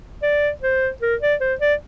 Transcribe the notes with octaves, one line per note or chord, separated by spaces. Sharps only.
D5
C5
A#4
D5
C5
D5